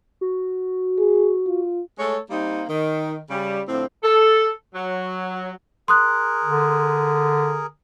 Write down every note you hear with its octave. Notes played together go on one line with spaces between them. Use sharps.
F#4
G#4
F4
G#3 A3 A4 C#5
G3 A#3 C4 D#4
D#3
C#3 G3
A2 D3 F3 C4
A4
F#3
G#4 A#4 C6 D#6 F#6
D3